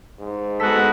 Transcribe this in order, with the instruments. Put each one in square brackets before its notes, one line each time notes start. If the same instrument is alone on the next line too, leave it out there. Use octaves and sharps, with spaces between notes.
[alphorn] G#2
[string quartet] G#3 B3 F#4 [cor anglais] A4 [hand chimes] F#6 B6